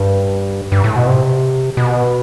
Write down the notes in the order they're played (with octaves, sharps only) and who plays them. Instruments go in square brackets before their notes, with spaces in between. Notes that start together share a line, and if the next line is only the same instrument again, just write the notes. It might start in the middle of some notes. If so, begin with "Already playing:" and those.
Already playing: [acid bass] G2
G2
A2
B2
C3
B2